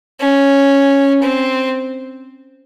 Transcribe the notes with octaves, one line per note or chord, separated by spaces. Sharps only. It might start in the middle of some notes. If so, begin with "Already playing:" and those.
C#4
C4